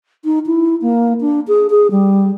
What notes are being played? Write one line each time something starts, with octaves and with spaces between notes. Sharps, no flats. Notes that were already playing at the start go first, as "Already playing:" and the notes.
D#4
E4
A#3
D4
G#4
G#4
G3